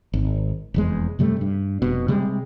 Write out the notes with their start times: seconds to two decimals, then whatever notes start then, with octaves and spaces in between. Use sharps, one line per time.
0.13 G#1
0.74 F1 E2 G#3
1.19 F#2 C3 G3 A3
1.41 G2
1.82 F1 B2
2.08 C3 G3 G#3